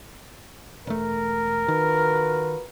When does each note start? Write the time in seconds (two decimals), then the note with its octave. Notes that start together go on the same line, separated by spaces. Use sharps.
0.87 E1 A3 A#4
1.68 D#3 F4 F#4 B4